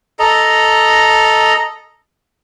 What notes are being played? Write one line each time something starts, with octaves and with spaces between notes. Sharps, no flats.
A4 D#5 A#5